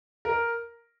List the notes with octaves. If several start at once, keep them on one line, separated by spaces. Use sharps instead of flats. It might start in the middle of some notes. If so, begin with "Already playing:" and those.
A#4